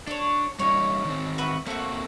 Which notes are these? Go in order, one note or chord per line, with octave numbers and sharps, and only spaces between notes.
D4 A4 C#5
G3 C#4 D#4 C#5
D#3 C4
F#4 B4 E5
A3 A#3 C4 F#4 A4